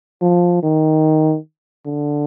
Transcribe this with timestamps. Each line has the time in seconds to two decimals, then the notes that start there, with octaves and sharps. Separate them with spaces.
0.22 F3
0.63 D#3
1.86 D3